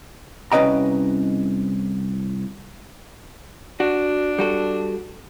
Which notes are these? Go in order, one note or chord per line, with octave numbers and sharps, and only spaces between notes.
C2 C#4 B4 D#5 G5 A#5
D4 F#4
G3 F#4 A4